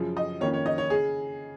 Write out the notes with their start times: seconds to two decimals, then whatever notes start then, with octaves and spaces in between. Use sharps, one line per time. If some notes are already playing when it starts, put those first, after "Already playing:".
Already playing: F#2 C#3 F3
0.17 D#5
0.41 F2 D#3 A#3 C#4 C#5
0.54 C#5
0.66 D#5
0.78 C#5
0.90 C#3 G#4